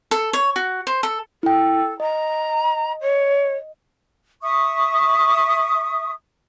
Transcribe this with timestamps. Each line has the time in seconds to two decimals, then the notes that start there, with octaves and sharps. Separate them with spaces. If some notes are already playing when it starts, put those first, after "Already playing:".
0.11 A4
0.33 C#5
0.56 F#4
0.87 C5
1.03 A4
1.43 E4 A4 G5
2.00 D#5 A#5
3.01 C#5
4.43 E5 C#6 D#6